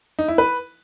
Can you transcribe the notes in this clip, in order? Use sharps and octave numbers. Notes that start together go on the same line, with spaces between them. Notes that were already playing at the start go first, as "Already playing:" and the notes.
D#4
E4
B4